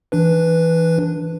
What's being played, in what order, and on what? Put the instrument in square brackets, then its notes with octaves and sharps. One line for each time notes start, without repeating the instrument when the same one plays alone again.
[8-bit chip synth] E3 D4 B4